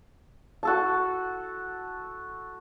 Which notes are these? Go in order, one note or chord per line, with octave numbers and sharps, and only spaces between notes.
F#4 A4 A5